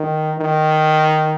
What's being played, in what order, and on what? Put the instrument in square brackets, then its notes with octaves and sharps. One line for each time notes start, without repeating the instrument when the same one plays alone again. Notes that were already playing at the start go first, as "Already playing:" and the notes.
Already playing: [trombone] D#3
D#3